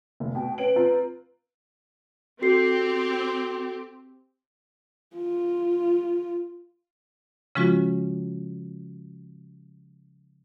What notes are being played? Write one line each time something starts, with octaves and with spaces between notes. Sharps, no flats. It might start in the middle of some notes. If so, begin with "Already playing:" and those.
F1
B2 G5
C#4 B4 D7 F#7
C4 F4 A#5
C4 F#4 G4 A4 C7
F4
C#3 F3 G#3 C#4 F4 F#4